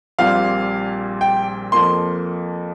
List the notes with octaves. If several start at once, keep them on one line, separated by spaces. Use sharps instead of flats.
A#1 A#2 G3 C4 F5
G5
F2 F3 A#3 C6